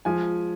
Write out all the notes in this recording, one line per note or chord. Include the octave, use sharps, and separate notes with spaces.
F3 G#3 G#5